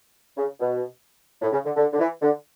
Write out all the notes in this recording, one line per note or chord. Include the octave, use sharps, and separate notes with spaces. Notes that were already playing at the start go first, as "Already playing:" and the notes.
C#3
B2
A2
C#3
D3
D3
D3
E3
D3